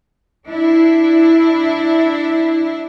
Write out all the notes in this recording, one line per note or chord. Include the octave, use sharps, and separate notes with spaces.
D4 E4